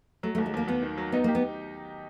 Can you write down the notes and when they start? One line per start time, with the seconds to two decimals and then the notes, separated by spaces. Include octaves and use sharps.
0.23 F#3 A3
0.35 A3
0.38 D#2
0.46 G#3
0.54 D#2 A#3
0.68 D#2 B3
0.82 D#3
0.97 F#3
1.12 B3 D#4
1.24 A#3 G4
1.35 B3